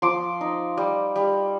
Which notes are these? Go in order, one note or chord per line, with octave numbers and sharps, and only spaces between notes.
F3 C6 D6
D#4
G3
G3